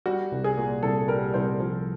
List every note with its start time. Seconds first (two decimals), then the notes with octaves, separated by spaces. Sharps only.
0.06 G3 F#4
0.32 C2
0.44 G#4
0.57 A#2
0.83 C2 A4
1.08 G3 A#4
1.34 C2 C5
1.60 F3